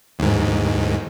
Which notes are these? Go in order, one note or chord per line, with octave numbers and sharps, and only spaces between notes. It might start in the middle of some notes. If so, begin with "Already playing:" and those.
D#2 G#2